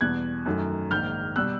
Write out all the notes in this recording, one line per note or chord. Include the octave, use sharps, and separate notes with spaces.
E2 B2 G3 F#6 G#6
F#2 D#3 F#3 A3
A#1 G#2 D#3 F6 G6
B2 G3 E6 F#6